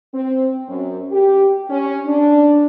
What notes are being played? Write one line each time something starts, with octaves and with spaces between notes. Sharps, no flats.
C4
F#2
G4
C#4
D4